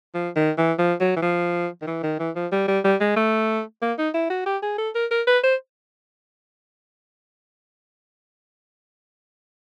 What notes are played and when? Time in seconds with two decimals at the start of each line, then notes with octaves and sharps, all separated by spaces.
0.14 F3
0.36 D#3
0.58 E3
0.79 F3
1.00 F#3
1.16 E3
1.22 F3
1.82 D#3
1.87 E3
2.03 D#3
2.19 E3
2.36 F3
2.52 G3
2.68 G3
2.84 G3
3.00 G#3
3.16 A3
3.82 A#3
3.98 D#4
4.14 E4
4.30 F#4
4.46 G4
4.62 G#4
4.78 A4
4.95 A#4
5.11 A#4
5.27 B4
5.44 C5